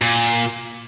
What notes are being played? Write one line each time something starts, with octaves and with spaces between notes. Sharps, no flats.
A#2